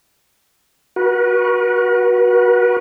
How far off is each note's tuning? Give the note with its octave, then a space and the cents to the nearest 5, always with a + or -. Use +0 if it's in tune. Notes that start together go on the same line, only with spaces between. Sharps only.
F#4 +0 B4 -40